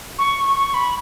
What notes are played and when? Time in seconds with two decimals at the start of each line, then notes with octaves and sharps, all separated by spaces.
0.18 C#6
0.56 C#6
0.74 B5